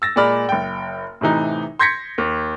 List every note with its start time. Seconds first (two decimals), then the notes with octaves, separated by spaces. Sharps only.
0.02 E6 A6 A#6
0.16 A#2 G#3 D5 B5 F6
0.49 F#1 G5
1.21 A2 C3 E3 D#4
1.79 C6 G6 G#6 A#6 B6 C#7
2.18 D#2